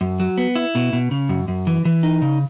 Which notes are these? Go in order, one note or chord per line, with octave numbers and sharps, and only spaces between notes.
F#2
F#3
B3
E4
B2
B2
C#3
F#2
F#2
E3
E3
D#4
C#3